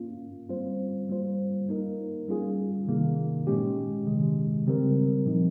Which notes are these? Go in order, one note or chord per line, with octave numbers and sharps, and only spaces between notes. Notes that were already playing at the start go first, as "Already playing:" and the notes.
Already playing: A#3 C#4 F4
G3 C4 F4 C5
G3 A#3 F4 C5
A#3 D#4 A#4
G3 C#4 F4 G#4
C3 D#3 A#3 D#4
A#2 G#3 C#4 G4
C3 D#3 G#3
C#3 G3 C4 G4 A#4
A#2 F3 C4 D#4